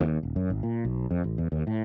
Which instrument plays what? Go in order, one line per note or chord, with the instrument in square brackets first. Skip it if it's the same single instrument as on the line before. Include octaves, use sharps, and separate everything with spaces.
[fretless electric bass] D#2
D#1
F#2
G#1
A#2
B1
F2
A1
E2
D#2
A2